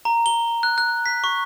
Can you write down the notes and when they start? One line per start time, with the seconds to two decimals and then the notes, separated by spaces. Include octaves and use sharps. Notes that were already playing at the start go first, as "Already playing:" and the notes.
0.05 A#5
0.26 G7
0.63 F#6
0.78 F#6
1.06 B6
1.24 C#6